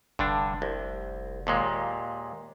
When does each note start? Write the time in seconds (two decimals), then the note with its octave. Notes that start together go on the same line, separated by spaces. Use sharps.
0.19 F1 G2 D3 D4
0.62 C2
1.47 D#2 A#2 G#3